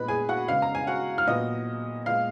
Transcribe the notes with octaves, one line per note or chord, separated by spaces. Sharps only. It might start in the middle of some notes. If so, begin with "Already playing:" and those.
Already playing: A#2 G#3 B3 B4 B5
G#4 G#5
F#4 F#5
C#3 G#3 B3 F5
A#5
G#5
F#4 F#5
F6
A#2 F#3 B3 D#5 D#6
A#2 G#3 B3 F5 F6